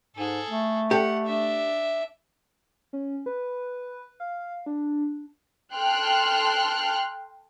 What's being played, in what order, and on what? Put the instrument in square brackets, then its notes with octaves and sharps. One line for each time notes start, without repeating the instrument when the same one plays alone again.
[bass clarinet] G#2 [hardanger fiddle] G#4 A4
[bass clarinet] A3
[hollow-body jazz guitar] G4 A4 D5 [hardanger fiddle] F#5
[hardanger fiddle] D4 E5
[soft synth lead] C#4
B4
F5
D4
[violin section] A4 G5 C6 F6 F#6